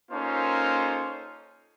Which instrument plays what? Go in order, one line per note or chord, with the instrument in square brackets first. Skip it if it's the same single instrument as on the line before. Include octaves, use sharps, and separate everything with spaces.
[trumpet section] A#3 C#4 D#4 F4 A4 C5